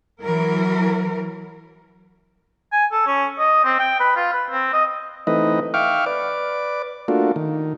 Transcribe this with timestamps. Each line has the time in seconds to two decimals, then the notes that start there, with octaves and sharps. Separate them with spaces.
0.22 E3 F#3 A#4
2.72 G#5
2.92 A4
3.06 C#4
3.39 D#5
3.64 C4
3.79 G5
4.00 B4
4.16 F4
4.33 B4
4.50 C4
4.73 D#5
5.27 E3 A3 C4 D#4 B4 D#5
5.74 E5 F5 G5 C#6 D6 F6
6.06 B4 D5 D6
7.08 A3 A#3 D4 F4 F#4
7.36 D#3